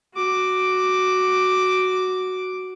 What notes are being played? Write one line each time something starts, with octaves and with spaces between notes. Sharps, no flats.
F#4 D6